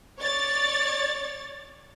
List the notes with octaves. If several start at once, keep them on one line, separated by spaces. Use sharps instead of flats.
C#5 D5 A6